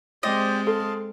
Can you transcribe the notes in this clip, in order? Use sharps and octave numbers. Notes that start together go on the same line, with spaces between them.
G#3 C4 G4 C5 D5 D#5
A4 F5 A5 C6